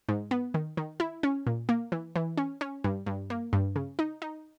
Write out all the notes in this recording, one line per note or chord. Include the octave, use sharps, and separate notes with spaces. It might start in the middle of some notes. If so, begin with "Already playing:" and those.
G#2
B3
D#3
D#3
E4
C#4
A#2
A#3
E3
E3
C#4
C#4
G2
G2
A#3
G2
C#3
D#4
D#4